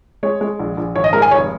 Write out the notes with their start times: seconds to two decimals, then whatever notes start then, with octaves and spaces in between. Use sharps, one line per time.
0.23 G#3 C#5
0.41 G#3
0.59 A#1
0.77 A#1
0.95 G#1 C#5
1.04 D#5
1.13 G#3 A#4
1.22 G#5
1.31 F1 C#5